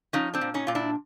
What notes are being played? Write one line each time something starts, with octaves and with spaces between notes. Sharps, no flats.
F3 C#4 D#4
C4 D4
A#2
C#4 D#4
A#2 F4
D4 E4